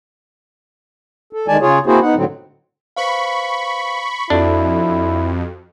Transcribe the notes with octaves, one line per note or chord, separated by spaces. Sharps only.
A4
D#3 G#3 D5 G#5 A5
C#3 F4 G#4 C#5
A#3 C4 E4 F#4 G#4 C5
B3 D#4 F#5
A2 D3 F#3 C4
B4 C5 F5 B5 C#6
F2 D4 E4 F#4 A4